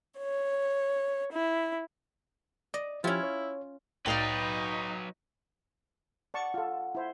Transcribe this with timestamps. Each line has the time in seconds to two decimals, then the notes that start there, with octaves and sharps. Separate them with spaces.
0.18 C#5
1.32 E4
2.74 D5 D#5
3.04 F3 C#4 E4 F4 G4
3.23 C#5
4.06 C2 A2 F#3 D#4 B4 D5 F5 G5
6.34 D5 F#5 A5 C#6
6.54 F4 A4
6.95 E4 C5